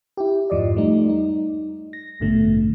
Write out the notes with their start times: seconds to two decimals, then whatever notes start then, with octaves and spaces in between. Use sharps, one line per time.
0.17 E4 G4
0.50 F2 G#2 F3 D5 D#5
0.76 G3 A3 D#4
1.09 D#4
1.93 A#6
2.20 A1 G2 B2 D3 A3